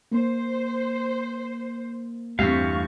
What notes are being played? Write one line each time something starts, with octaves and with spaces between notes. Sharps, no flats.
A#3 C5
E2 G2 A3 C4 G4 F5 C#6 B6